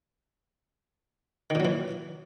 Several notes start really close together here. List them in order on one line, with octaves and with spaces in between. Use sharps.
D#3 A#2 F#3 E3